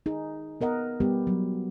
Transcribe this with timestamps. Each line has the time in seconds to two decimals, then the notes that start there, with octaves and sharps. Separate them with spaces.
0.06 D#4 G#4
0.61 B3 A#4 D#5 F#5
1.00 G3 B3 G4
1.27 F#3